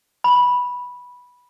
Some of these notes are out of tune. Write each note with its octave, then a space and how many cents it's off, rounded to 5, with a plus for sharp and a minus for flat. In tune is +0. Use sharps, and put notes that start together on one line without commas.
B5 -10